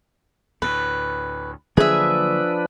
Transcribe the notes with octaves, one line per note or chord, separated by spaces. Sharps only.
D2 A2 B4
D3 F3 F#3 A#3 D4 G#4 B4 E5